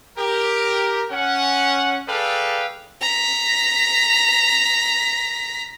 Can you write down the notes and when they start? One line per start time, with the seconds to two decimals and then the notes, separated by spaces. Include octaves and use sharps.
0.18 G4 A#4
1.11 C#4 F#5
2.09 G#4 A4 B4 D5 F5 G5
3.01 A#5 B6